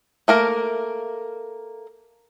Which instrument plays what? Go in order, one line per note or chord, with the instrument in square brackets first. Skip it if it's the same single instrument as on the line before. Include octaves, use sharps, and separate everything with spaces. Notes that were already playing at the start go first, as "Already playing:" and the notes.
[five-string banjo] A3 A#3 A#4